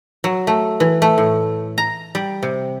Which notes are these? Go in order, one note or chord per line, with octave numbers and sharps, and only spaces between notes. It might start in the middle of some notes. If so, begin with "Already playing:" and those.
F#3
A3
E3
A3
A2
A#5
G3
C3